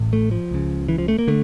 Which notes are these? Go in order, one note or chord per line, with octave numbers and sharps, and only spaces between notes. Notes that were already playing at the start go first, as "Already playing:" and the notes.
Already playing: A1 A2
A3
F3
C#2 C#3
E3
F3
A3
A#3
D3 A3